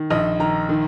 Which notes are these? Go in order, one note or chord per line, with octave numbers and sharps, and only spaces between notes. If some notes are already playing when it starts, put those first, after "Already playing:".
Already playing: D#3
A#1 D#5
D#3 A#5
D#3